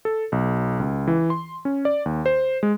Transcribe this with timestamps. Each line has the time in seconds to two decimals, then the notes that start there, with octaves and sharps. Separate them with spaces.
0.05 A4
0.32 B1
0.79 C#2
1.07 E3
1.30 C6
1.65 C#4
1.85 D5
2.06 D#2
2.26 C5
2.63 G#3